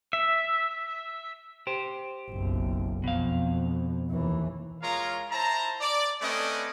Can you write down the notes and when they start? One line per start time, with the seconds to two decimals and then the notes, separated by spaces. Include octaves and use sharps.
0.13 E5
1.67 G4 C5
2.30 F#1 B1
3.04 F2 B2 F5
4.10 D#2 E3
4.82 G#3 F4 A#4 C#5 F5 A#5
5.31 E4 C5 A5 A#5
5.81 D5
6.22 A3 C4 C#4 B4 D5 D#5